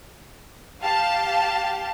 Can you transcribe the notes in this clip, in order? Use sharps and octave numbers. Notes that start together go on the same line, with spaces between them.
G4 F5 A5